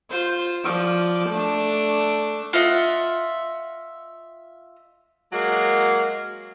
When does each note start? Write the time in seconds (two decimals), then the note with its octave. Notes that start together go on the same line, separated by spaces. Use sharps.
0.10 F4 C5
0.64 F3 D5
1.29 A3 D4
2.53 F4 D#5 E5 F#5
5.33 F#3 G#3 A#3